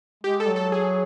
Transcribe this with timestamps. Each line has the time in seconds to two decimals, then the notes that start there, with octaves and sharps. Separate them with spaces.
0.24 G#3 G4
0.40 A4
0.48 F#3
0.56 A4
0.72 G#4